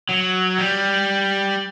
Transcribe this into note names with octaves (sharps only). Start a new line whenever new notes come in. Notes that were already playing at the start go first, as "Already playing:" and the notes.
F#3
G3